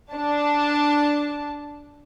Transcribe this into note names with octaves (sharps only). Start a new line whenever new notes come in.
D4 A5